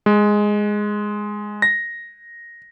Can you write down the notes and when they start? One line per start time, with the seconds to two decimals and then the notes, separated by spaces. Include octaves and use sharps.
0.06 G#3
1.62 A#6